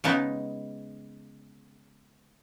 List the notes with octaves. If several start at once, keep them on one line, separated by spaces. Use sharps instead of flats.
C#3 G#3 B3 D#4